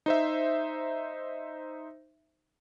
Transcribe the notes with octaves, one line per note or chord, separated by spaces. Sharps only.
D#4 C5 E5